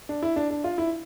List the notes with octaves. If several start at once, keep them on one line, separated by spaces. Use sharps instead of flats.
D4
E4
D4
D4
F4
E4